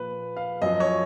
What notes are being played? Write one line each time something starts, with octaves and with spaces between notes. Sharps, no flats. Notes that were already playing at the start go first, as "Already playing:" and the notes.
Already playing: A#2 F3 B4
F5
F#2 F3 D#5
C#5